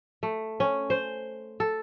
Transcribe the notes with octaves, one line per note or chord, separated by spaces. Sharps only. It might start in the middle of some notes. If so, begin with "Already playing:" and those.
A3
C#4
C5
A4